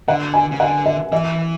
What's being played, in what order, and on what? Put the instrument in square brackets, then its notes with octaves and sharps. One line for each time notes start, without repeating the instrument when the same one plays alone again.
[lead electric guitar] D3 [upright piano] F#5
[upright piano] G#5
[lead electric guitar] C#3
[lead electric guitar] D3 [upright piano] F#5
[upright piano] E5
[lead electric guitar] E3 [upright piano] E5